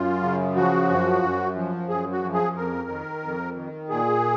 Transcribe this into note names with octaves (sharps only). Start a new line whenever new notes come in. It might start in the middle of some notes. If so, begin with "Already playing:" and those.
Already playing: F#2 F4
C#3
F3 F#4
F#2
F#2
F3
F#2 G#4
F#4
F3
G#4
F2 A#4
D#3
F2
D#3
A#2 G#4